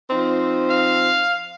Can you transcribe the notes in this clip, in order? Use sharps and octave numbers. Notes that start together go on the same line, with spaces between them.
F3 C4 D#4
F5